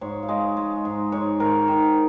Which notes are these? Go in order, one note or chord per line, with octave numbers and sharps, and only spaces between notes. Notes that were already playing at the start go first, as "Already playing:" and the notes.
G#2 C#5
F5
G#3 D#5
G#3
G#2
G#2 C#5
G#2 A#4
D#3